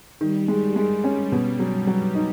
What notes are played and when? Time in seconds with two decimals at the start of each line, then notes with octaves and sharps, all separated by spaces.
0.21 D#3 G3
0.48 G#3
0.76 G#3
1.04 C#4
1.32 B2
1.59 F#3
1.87 F#3
2.15 D#4